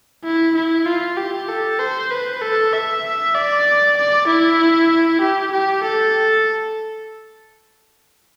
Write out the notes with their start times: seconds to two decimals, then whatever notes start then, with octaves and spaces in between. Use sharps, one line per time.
0.24 E4
0.55 E4
0.86 F4
1.17 G4
1.49 A4
1.79 C5
2.11 B4
2.42 A4
2.73 E5
3.34 D5
3.97 D5
4.28 E4
5.21 G4
5.52 G4
5.83 A4